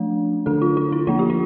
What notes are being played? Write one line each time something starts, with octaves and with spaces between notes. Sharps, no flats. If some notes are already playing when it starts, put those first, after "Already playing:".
Already playing: F3 A3 D4
D3 A3 D4 A4
F4
F4
E4
F3 A#3 D4 F4
G4
F4